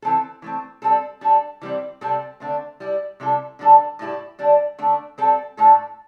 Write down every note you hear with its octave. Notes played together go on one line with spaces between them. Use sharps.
E3 C4 A4
E3 A3 C4
G3 C4 A4
G3 D4 A4
E3 G3 C4
C3 G3 C4 A4
D3 A3 C4
G3 E4 G4
C3 G3 E4 A4
D3 G3 D4 A4
A2 G3 E4 G4
D3 G3 D4
D3 A3 D4
G3 C4 A4
A2 A3 D4 A4